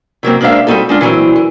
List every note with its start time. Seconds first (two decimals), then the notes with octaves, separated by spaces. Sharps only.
0.23 C3 F#3 A#3 C4
0.41 G#3 A#3 D4 C5 E5 F5
0.67 G3 C4 D4 D#4 F#4 A4
0.89 G#3 D4 F4
1.01 A#2 E3 F#3 C4
1.36 E3